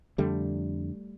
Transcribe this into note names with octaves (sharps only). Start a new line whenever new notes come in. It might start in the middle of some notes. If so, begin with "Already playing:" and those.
F2 D3 G3 A3